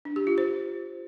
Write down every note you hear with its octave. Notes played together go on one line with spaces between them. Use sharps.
D4
G4
F4
C5